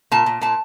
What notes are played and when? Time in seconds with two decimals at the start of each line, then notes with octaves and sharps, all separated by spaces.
0.12 A#2 A5
0.26 A#2
0.41 A#2 A5